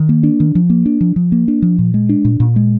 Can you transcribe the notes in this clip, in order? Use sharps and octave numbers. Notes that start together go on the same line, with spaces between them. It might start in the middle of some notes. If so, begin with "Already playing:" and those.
Already playing: D#3
A#3
D4
D#3
F3
A#3
D4
F3
F3
A#3
D4
F3
A#2
G#3
D4
A#2
A#2
G#3